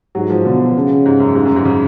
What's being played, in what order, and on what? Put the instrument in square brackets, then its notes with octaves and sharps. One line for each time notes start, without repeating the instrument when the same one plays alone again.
[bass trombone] G#2 [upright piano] F#3
[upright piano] F3
[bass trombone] B2 [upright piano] D3
[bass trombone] C#3
[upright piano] G#2
F#2
G#2
F#2
G#2
C#3